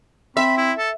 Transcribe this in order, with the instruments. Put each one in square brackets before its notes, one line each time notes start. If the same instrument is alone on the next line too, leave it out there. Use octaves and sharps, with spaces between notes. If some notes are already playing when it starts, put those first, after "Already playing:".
[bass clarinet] C4 [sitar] E5 [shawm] B5
[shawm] E4
A4